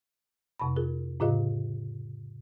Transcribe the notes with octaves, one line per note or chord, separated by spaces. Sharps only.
F2 C3 A5 B5
F4 G#4 A#4
A2 C#3 F4 G#4 D#5 F5